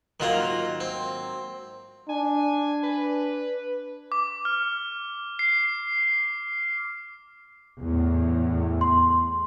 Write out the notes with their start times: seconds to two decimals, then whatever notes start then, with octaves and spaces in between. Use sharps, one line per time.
0.20 G#2 D#3 F#3 A#3 F4 A#5
0.80 C4
2.09 D4 G#5
2.83 B4
4.12 D6
4.45 F6
5.39 C7
7.80 E2 A2
8.81 C6